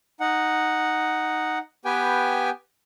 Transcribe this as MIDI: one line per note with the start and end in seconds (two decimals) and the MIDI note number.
0.20 1.59 63
0.20 1.59 78
1.85 2.50 59
1.85 2.50 67
1.85 2.50 71
1.85 2.50 79
1.85 2.50 80